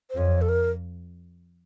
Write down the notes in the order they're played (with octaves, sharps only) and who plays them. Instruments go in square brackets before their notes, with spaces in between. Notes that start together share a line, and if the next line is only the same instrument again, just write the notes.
[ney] C5
[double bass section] F2 [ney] C#5
[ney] A4
A#4